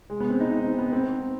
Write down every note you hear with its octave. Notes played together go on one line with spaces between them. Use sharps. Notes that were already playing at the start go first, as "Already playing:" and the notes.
G#3
B3
C4
D#4
D#4
C4
B3
C4